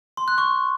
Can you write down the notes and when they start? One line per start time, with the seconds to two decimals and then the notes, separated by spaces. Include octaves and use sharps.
0.17 C6
0.28 F#6
0.38 C#6